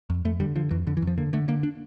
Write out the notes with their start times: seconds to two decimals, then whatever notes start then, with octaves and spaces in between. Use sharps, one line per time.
0.10 F2
0.25 F2 A3
0.40 D3 G3
0.56 D3 F3
0.71 F2 E3
0.87 F2 D3
0.97 E3
1.02 F2
1.07 F3
1.18 D3 A#3
1.33 D3 A3
1.48 D3 A#3
1.63 D4